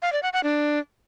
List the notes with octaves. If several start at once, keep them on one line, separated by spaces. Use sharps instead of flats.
F5
D5
F#5
F#5
D4